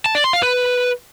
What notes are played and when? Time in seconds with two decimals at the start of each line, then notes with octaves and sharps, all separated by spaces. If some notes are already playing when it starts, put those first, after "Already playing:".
0.06 A5
0.15 D5
0.24 C6
0.33 F5
0.43 B4